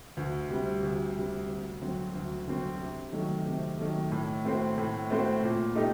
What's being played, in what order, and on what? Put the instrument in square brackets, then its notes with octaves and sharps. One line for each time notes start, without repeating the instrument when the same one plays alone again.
[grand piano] D2
C3 G3
D2
C3 G3
D2
D3 F#3 C4 F#4
D2
D3 F#3 C4 F#4
C3
D#3 F#3 A3
C3
D#3 F#3 A3
A2
A3 C4 F#4 C5
A2
A3 C4 F#4 C5
A#2
A3 D#4 G4